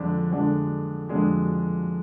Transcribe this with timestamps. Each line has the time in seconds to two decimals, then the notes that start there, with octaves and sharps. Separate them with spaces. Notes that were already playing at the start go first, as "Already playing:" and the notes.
Already playing: F2 D3 G#3 D4
0.31 F2 D3 G#3 D4
1.09 F2 D3 G#3 D4